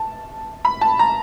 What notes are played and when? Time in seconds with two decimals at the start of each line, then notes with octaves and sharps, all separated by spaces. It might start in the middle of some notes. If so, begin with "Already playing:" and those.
Already playing: A5
0.65 B5
0.81 A5
0.99 A#5